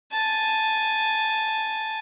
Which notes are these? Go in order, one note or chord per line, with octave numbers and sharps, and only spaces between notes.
G#5 A5